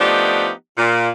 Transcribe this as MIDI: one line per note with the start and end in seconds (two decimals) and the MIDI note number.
0.01 0.51 53
0.01 0.51 57
0.01 0.51 59
0.01 0.51 62
0.01 0.51 63
0.01 0.51 67
0.78 1.10 46